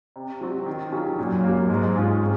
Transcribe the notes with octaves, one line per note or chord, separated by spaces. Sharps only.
C3
F#3 C4 F#4
D#3
F#3 C#4 F4 G#4
F#2 A#2
F#3 A#3
G#2 G#3
C#4 F4 G#4
C3